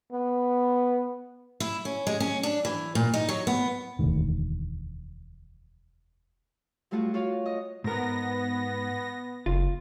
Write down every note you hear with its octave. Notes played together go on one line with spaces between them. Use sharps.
B3
E4
C#4
G#3
C#4
D4
E3
A#2
D#4
F#3
B3
E1 D2 D#3
F#3 G3 A3 F4 F#4
F4 F#4 C#5 F5
D#5
G#2 B3 A#4 A#6
F#1 F4